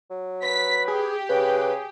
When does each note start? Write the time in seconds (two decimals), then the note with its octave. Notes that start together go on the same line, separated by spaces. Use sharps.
0.11 F#3
0.44 B4 B6
0.88 G4 G#4
1.29 C#3 G#4 B4